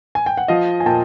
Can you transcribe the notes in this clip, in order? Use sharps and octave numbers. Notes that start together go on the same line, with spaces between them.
G#5
G5
F#5
F3 D#5 F5
G#5
A#2 G5 A5